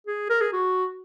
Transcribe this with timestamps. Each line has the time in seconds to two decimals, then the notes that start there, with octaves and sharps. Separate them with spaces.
0.07 G#4
0.30 A#4
0.41 G#4
0.53 F#4